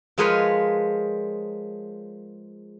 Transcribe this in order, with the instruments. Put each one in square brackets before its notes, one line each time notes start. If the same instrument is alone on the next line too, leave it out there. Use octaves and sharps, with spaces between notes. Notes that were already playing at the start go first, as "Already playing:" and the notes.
[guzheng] F3 G#3 G#4 A#4 B4 C#5